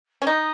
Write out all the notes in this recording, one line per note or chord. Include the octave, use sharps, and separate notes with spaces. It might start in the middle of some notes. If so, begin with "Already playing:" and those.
C#4
D#4 D#6